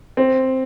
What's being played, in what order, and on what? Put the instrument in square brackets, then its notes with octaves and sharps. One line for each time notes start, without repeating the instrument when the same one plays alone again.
[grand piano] C4